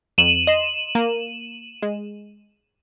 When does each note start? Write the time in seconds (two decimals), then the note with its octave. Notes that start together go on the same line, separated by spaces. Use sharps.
0.18 F2 D#7 E7 F#7
0.47 D#5 C6
0.95 A#3
1.82 G#3